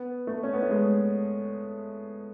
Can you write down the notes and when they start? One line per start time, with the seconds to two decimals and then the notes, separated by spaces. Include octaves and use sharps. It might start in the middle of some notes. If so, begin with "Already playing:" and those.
Already playing: B3
0.27 A3
0.43 C#4
0.54 B3
0.62 A3
0.70 G#3